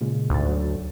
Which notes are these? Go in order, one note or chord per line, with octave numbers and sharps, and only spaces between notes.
A#2 C#3 G#3
D2 G#2 A6
F#3